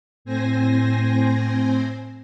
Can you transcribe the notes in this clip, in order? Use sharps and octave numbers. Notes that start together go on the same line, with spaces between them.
A2 C4 C5 G#5 A#6